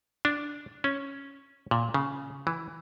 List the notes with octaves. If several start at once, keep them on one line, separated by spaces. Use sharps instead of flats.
D4
C#4
A#2
C#3
E3